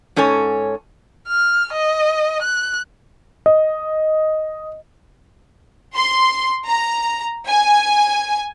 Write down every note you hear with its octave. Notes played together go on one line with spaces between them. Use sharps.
G#2 C#4 A4 C#5 G#5
F6
D#5
F#6
D#5
C6
A#5
G#5